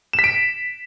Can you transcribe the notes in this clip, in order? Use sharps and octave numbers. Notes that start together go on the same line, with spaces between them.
E7
B6
D7